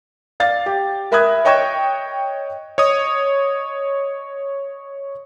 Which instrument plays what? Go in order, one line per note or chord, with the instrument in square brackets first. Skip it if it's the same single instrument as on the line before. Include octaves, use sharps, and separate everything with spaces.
[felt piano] D5 F5 A6
G4
A#4 E5 B5 D#6 F#6 G#6
C#5 D#5 G5 C#6 G#6 E7
[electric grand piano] C#5 D#5 D#6